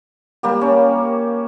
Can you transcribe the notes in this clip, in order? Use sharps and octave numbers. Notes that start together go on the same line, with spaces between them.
G3 A#3 G4
C#4